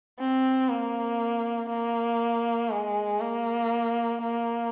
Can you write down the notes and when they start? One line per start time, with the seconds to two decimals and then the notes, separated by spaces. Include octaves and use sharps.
0.19 C4
0.69 A#3
1.69 A#3
2.70 G#3
3.20 A#3
4.22 A#3